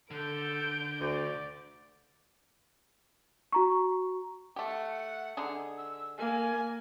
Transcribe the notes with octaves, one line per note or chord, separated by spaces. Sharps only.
D3 A4 G6 D7
D2 D5
F#4 A#5 C#6
A3 G4 F#5
D3 D#4 G#4
E6
A#3 G#5